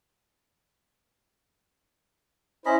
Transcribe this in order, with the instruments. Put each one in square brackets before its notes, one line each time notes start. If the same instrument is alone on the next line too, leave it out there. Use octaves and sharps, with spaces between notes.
[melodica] C#4 D#5 B5 [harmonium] E4 C5